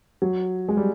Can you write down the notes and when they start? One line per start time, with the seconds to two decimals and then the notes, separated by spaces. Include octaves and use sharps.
0.22 F#3
0.68 G#3
0.77 G3